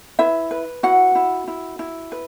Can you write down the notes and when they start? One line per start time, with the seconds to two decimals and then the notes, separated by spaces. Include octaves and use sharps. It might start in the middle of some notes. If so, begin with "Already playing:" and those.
0.19 E4 B4 E5
0.51 B4
0.83 E4 F#4 F#5
1.15 E4
1.48 E4
1.79 E4
2.12 B4